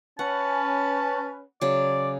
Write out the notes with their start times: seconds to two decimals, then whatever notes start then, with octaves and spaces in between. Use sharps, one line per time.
0.19 C#4 B4 F#5 A5
1.61 C#3 F#3 D5